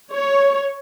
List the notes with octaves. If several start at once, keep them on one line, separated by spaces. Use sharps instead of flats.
C#5